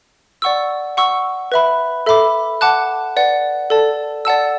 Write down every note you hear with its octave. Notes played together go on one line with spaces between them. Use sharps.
D5 F#5 C#6 E6
F#5 C#6 E6
B4 E5 B5
A4 E5 B5 D6
F#5 A5 D6 F#6
B4 D5 F#5
A4 D5 A5
D5 F#5 A5 E6